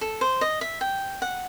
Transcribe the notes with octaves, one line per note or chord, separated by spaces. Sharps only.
A4
C5
D#5
E5
G5
F#5